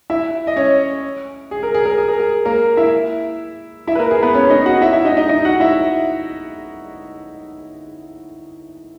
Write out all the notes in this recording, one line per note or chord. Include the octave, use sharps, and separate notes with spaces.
E4 E5
D#5
C#4 C#5
G#4
A#4
G#4
A#4
G#4
A#4
G#4
A#3 A#4
E4 E5
E4 E5
B4
A#3 A#4
G#4
B3 B4
C#4 C#5
D#4 D#5
F#4 F#5
E4 E5
E4 E5
D#4 D#5
D#4 D#5
D#4 D#5
F#4 F#5
E4 E5